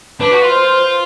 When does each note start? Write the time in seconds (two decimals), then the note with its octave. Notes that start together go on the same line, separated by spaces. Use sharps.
0.20 D4 B4
0.31 F#4
0.42 F4
0.53 C5